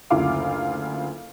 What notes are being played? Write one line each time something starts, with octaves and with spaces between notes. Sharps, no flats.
F#1 D2 C#3 F4 F5 D6